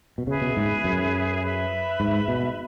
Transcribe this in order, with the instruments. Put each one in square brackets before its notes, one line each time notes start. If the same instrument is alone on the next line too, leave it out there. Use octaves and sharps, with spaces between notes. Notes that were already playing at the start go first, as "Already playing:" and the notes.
[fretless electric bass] B2
[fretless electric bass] C#3 [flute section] G#4 B4 E5
[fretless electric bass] B2
G#2
F#2
[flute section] B4 E5 B5
[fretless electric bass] G#2
B2